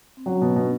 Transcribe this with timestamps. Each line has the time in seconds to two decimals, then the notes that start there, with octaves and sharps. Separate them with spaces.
0.17 C4
0.26 F#3 C#4
0.41 B2
0.56 B2 D4